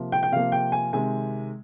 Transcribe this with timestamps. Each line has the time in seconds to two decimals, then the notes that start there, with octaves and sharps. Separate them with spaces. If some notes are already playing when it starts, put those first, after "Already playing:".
Already playing: C3 F3 A#3
0.12 G5
0.23 G5
0.32 C3 F3 A#3 F5
0.52 G5
0.72 G#5
0.93 C3 D#3 G#3 G#5